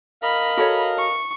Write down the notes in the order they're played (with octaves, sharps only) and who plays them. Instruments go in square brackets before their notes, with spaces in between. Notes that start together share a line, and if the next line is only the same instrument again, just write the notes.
[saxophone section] A#4 D#5 F5 [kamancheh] B5
[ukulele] F#4 A4 C#5
[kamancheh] C#6